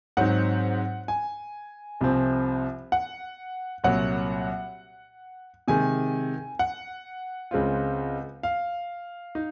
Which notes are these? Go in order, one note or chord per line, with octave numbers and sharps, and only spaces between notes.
G#2 F#3 C4 D#4 F#5
G#5
C2 C3 F3 C4
F#5
C2 A#2 F#3 F#5
C3 D#3 G#3 G#5
F#5
C#2 C#3 G#3 C4 F4
F5
D#4